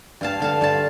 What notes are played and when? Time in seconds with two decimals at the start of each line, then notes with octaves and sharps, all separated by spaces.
0.21 G2 F5 A5
0.40 D3 F5 A5
0.61 G2 F5 A5